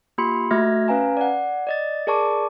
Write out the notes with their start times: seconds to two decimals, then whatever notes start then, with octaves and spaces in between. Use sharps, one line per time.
0.18 A#3 F4 G4 B5 C6 C#7
0.51 A3 F#4 E5 F6 G#6 A#6
0.88 C#4 B4 F5 G#5 A#5
1.17 D5 F#5
1.67 D5 D#5 A6
2.07 G#4 A#4 D5 A5 C#6 D6